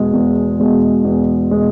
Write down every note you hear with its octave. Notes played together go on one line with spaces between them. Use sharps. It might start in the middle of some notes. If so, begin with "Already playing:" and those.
Already playing: E2 B2 G#3
E2
B2 G#3
E2
B2 G#3